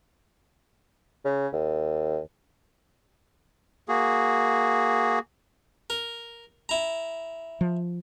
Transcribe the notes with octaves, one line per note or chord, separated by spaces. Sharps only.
C#3
D#2
A#3 F#4 G#4
A#4
E4 A#5
F3